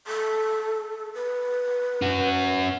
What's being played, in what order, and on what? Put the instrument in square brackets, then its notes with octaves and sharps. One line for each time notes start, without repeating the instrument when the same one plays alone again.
[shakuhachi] A4
B4
[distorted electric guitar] C#4 F#4